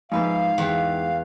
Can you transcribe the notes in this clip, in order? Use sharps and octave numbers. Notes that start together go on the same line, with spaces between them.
G#2 F3 B4 E5 F5
E2 F#5 G5